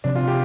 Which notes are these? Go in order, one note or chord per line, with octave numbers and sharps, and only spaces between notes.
C3 F3 C4 D4
F4
G4